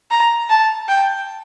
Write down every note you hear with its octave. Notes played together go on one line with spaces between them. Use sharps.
A#5
A5
G5